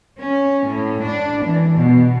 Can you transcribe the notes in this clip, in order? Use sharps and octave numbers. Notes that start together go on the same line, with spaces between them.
C#4
A2
D4
E3
B2